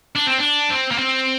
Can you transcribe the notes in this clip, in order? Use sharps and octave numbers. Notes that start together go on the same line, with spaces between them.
D4
C4
D4
C4
A#3
C4